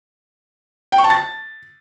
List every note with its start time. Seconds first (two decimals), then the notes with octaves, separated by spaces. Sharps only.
0.92 G5
0.98 C#6
1.04 A5
1.10 A6